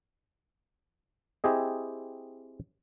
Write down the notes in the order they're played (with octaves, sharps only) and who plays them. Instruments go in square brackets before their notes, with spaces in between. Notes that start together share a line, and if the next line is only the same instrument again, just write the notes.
[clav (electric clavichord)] C4 E4 G4 G#4 D#5